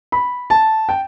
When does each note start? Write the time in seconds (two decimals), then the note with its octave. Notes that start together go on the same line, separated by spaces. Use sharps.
0.12 B5
0.50 A5
0.89 G5